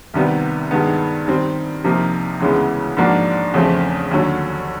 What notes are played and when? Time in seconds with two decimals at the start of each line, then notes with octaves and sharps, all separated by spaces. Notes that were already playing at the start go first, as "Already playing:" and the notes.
0.14 C2 C3 D#3 G3 B3
0.71 G2 D#3 G#3 B3
1.27 D#3 G3 C4
1.84 C2 C3 F3 A#3 D#4
2.40 D2 C#3 E3 G#3 B3
2.97 G#2 F3 A#3 D4 F#4
3.54 E2 C#3 F3 A3 C4
4.11 D#2 D3 F#3